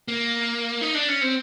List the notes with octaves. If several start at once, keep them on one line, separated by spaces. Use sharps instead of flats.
A#3
D#4
D4
C#4
C4